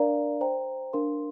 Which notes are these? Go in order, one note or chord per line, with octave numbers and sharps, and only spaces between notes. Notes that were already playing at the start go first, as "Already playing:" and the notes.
Already playing: D4 A#4 D5 F5 A#5
C5 G5 A#5
D4 A#4 F5 C6